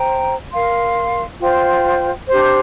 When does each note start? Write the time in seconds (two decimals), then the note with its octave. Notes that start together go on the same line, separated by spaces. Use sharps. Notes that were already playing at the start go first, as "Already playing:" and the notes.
Already playing: C5 G5 A#5
0.53 A#4 F5 C6
1.40 F4 C5 G5
2.29 D4 G4 C5